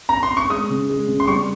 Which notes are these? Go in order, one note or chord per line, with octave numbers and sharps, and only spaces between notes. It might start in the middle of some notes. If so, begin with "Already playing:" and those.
A#5
C6
C#6
G#3 D#6
C#3
G#3
C#3
C6
G3 C#6